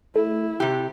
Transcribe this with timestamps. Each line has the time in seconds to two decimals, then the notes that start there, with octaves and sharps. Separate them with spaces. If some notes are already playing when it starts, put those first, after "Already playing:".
0.15 A3 E4
0.60 C3 G4